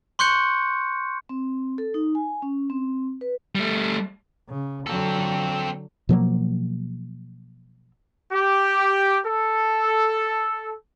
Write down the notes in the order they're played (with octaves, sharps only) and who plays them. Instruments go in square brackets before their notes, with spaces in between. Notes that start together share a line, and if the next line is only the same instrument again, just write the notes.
[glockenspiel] C6 C#6 F#6 G6 C#7
[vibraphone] C4
A4
D#4
G#5
C#4
C4
B4
[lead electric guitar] G3 A3
[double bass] C#3
[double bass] D3 F#3 [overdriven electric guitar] C4 A4
[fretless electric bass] B2 F3 F#3 A#3
[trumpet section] G4
A4